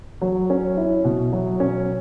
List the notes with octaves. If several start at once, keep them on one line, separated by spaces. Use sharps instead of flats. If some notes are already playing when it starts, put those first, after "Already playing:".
F#3
C#4
E4
B2
F#3
C#4